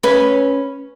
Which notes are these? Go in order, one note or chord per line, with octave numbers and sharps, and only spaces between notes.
C#4 B4